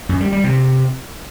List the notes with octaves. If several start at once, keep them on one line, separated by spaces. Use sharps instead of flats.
F#2
G3
G3
C3